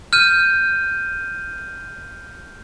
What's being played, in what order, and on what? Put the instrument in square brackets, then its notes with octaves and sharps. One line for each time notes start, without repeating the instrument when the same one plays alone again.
[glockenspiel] F6 G6 D#7